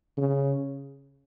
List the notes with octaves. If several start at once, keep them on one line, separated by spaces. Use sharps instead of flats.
C#3